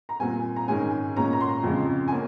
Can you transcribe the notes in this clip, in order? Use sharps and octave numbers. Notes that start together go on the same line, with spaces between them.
A#5
A#2 G3 C4 G#5
A#5
G#2 D#3 G#3 C#4 G#5
A#2 G#3 C#4 A#5
A#5
C6
F2 C#3 G#3
G#5
A#3 C#4